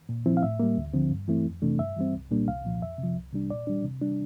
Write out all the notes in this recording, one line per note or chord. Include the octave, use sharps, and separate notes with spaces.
A#2
F3 C4 E4
F5
A2 E5
G3 A#3
D2
D3 F3 C4
G2
E3 A3 C4 E4
F2
C3 E3 A3 D4
G2 E5
E3 G3 C4
C2
A#2 G3 A#3 D4
C2 F5
A#2 F3
F2 E5
C3 F3
C2
C3 G3 D4
A#2 D5
G3 D4
C3
G3 D4